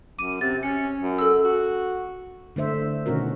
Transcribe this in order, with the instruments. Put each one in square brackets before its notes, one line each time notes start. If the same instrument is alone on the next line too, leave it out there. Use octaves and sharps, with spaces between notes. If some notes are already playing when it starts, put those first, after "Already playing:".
[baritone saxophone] F#2 [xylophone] D6 D#7
[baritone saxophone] C3 [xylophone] A6
[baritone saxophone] C#4 [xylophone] C#7
[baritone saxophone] F#2
[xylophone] A4 E6
[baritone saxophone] F#4
[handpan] D3 A3 C5 E5
B2 D#3 C#4 F#4 A#4